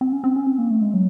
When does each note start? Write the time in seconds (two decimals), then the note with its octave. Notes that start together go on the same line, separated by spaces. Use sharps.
0.01 C4
0.12 C#4
0.24 C4
0.36 C#4
0.47 C4
0.58 A#3
0.71 A3
0.82 G#3
0.94 F#3